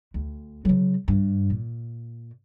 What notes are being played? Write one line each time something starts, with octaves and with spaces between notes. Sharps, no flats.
D2
C#3 F#3
G2
A#2